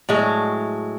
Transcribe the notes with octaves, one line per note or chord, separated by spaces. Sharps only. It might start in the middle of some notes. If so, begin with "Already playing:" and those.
A2 F#3 G#3